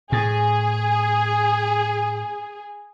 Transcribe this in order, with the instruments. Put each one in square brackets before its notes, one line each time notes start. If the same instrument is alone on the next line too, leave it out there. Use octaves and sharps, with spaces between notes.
[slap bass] A2 [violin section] G#4